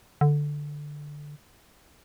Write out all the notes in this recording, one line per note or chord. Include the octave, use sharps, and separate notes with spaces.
D3